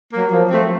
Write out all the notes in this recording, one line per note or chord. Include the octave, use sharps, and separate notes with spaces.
F#3 A#3
F3
A3 C4